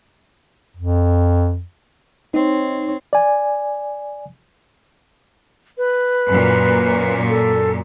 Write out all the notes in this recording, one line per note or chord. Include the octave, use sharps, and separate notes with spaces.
F2
C4 D#4 C#5
D5 G#5
B4
F#2 A#2
A4